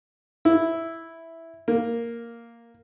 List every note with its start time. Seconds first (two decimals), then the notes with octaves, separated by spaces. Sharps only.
0.45 E4
1.68 A#3